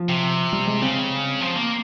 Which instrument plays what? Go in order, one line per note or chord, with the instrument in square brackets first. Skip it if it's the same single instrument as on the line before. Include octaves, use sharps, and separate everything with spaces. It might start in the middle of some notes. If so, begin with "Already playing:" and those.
Already playing: [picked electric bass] F3
[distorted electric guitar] C3
[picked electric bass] G3
G#3
[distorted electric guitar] C#3 [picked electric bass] C4
[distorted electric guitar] F3
A#3